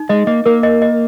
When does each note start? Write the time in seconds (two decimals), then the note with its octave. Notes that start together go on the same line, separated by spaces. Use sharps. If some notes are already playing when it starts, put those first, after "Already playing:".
Already playing: D#4
0.09 G#3 D#5
0.27 A#3 D#5
0.46 A#3 A#4
0.63 D#5
0.82 D#5